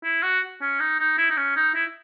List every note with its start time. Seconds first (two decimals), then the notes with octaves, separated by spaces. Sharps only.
0.04 E4
0.23 F#4
0.61 C#4
0.80 D#4
0.99 D#4
1.18 E4
1.30 D#4
1.37 C#4
1.56 D#4
1.75 E4